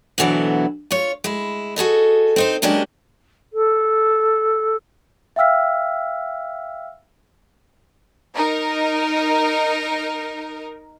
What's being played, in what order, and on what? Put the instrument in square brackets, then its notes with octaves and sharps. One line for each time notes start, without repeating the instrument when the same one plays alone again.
[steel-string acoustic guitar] D2 B2 D3 E3 F#3 B3
F4 C#5
G#3 E4
F#4 G#4 A4 D#5
C4 D#4 C5
C#3 F#3 G#3 A#3 D4 G4
[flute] A4
[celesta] E5 F5 G5 E6 F6 B6
[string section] D#4 A#4